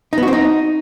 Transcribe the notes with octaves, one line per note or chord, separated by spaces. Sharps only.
D#4
B3
F#4
C4
D#4